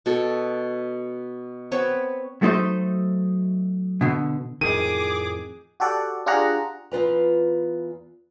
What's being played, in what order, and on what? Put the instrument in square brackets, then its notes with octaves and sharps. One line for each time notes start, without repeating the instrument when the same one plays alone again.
[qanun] B2 A4
B3 C4 B4 C#5
[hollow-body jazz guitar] F#3 A3 D#4 C5
B2 D3
[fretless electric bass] F2 A2 D#3 [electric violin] G#4 D6 [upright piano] D#7
[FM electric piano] F#4 G4 A4 D5 F#5
D4 F4 G4 G#4 F#5 A#5
[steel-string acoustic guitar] E2 F4 B4 A#5